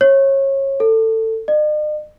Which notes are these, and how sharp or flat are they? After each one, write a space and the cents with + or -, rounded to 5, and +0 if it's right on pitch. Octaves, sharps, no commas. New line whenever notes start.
C#5 -25
A4 +20
D#5 -45